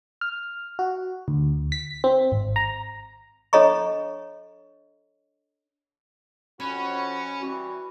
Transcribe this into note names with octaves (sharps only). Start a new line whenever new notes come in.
F6
F#4
D2
B6
C4
G#1
A#5
D4 A4 C#5 D#5 A#5 C#6
F2 C#4 F#4 B5
E3 G3 F#4